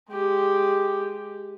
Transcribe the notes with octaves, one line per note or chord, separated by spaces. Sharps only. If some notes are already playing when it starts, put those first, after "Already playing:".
G#3 G4